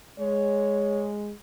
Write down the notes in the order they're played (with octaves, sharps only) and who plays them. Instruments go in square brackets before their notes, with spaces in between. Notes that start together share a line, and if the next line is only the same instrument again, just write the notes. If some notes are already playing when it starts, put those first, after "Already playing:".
[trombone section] G#3 [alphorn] C#5